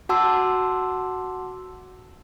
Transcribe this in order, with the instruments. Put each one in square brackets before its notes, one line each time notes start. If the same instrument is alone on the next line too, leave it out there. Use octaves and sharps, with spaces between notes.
[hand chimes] F#4 F#5 A5 C6 D6 E6